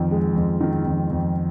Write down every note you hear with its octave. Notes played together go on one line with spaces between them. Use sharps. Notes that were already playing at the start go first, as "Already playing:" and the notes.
Already playing: F2 D#3
G#3
F2
D#3
F2
F2